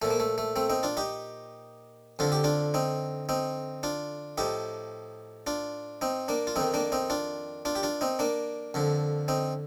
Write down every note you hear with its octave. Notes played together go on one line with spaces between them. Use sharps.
A#2 F3 A3
A#3
A3
A3
A3 C4
C4 D#4
D4 F4
D#4 G4
F2 D3 F3 F4
G4
D4 F4
C4 D#4
C4 D#4
D4 F4
A2 F3 D#4 G4
D4 F4
C4 D#4
A#3 D4
F4
F2 D#3 C4 D#4
A#3 D4
C4 D#4
D4 F4
D4 F4
G4
D4 F4
C4 D#4
A#3 D4
F2 D3 F3
C4 D#4